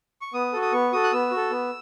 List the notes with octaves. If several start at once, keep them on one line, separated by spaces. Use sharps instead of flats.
C#6
B3 D#6
F#4 A4
D#6
B3 C#6
F#4 A4 D#6
F#6
B3 E6
F#4
A4
B3